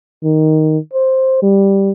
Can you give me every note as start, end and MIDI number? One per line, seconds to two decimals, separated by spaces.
0.24 0.78 51
0.93 1.38 72
1.42 1.91 55